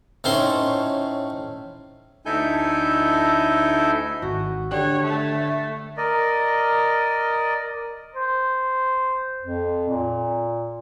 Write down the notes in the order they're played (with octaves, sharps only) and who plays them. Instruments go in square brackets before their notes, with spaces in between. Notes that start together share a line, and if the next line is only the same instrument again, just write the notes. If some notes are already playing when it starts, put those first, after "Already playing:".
[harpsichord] A2 A3 C#4 D#4 C5 C6
[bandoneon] D2 D#4 E4 A4 G#5 G6
[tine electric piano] G#1 [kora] F#4
[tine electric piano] D3 F#6 [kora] D4 G4 [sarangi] C#5
[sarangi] A3
[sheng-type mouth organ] A#4 D5 D#5
[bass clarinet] C5
F2
A#2